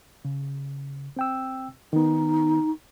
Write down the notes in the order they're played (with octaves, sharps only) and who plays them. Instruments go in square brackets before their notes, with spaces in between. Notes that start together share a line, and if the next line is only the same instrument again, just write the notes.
[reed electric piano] C#3
C4 G5 E6
[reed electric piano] D#3 B3 [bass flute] D#4